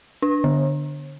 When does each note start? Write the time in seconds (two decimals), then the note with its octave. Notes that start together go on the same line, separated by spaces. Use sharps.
0.22 D4
0.44 D3